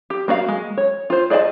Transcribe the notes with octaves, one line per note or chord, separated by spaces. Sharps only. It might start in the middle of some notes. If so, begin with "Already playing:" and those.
G4
A#3 F#4 D5 F5
G#3
C#5
F4 C5
G#4 D5 D#5 F5 A5